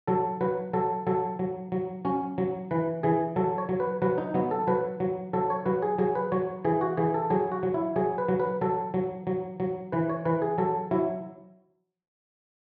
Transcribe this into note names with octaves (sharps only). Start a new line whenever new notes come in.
F#3 A4
F#3 B4
F#3 A4
F#3 A4
F#3
F#3
F#3 C#4
F#3
E3 B4
E3 G#4
F#3 A4
C#5
F#3
B4
F#3 B4
D#4
F#3 B3
A4
F#3 B4
F#3
F#3 A4
C#5
F#3 B4
G#4
F#3 G#4
B4
F#3 C#5
E3 G#4
F#4
E3 G#4
A4
F#3 G#4
F#4
F#3
E4
F#3 G#4
B4
F#3
B4
F#3 A4
F#3
F#3
F#3
E3 B4
C#5
E3 B4
G#4
F#3 A4
F#3 E4